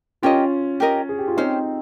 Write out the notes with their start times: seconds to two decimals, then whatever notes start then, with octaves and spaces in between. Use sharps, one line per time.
0.23 C#4 F4 G4 A#4 D#5
0.80 G4 A#4 D#5
1.09 G#4
1.19 G4
1.28 F4
1.37 C4 C#4 D#4 G4 C5